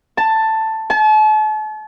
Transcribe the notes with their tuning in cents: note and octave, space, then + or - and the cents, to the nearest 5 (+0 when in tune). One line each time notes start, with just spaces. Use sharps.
A5 +10
A5 -40